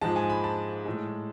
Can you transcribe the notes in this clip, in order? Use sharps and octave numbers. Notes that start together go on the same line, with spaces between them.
G#2 F3 G#3 A5
G#5
B5
A5
A2 G#3